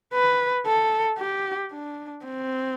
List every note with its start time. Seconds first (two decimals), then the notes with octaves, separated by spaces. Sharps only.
0.13 B4
0.66 A4
1.19 G4
1.72 D4
2.26 C4